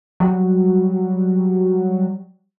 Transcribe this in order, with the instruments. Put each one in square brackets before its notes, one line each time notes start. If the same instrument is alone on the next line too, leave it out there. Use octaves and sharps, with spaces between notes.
[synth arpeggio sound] F#3 G3 F#4